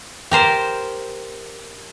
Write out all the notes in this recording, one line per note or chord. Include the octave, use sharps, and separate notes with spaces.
G4 A#4 C5 A5